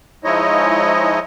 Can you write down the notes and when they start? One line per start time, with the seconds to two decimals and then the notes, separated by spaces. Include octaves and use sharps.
0.24 F3 G#3 D#4 E4 C#5 D#5